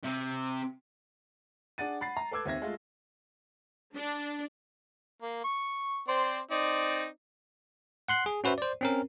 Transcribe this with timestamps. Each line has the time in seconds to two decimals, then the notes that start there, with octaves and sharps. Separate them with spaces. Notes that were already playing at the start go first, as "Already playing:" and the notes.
0.04 C3
1.78 D4 G#4 F#5 A6 D#7
2.01 F#5 B5 A6 C7
2.17 A#5
2.31 A4 B4 D6 E6 G#6
2.45 D#2 C4 E5 G#6 A#6
2.62 G#3 A3 F4
3.94 D4
5.22 A#3
5.44 C#6
6.08 C4 C5 D5
6.51 C4 D#4 D5
8.08 F#5 C6 F#6 C7
8.26 G#4
8.44 C#4 F#4 B4 C5 E5
8.58 C5 D5
8.81 C4 C#4 A#4